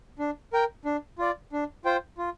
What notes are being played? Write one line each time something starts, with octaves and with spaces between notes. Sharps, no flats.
D4
A#4 G5
D4
F4 D5
D4
F4 C5 G5
F4